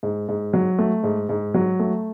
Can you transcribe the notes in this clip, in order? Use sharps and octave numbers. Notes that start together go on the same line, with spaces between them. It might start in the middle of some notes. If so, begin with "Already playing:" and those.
G#2
G#2
F#3
A3
G#2
G#2
F#3
A3